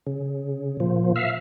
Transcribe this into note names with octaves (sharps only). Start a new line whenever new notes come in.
C#3
A#2 F3
E5 F5